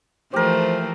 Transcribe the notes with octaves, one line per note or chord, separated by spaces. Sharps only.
E3 F3 A3 G4 A#4 C5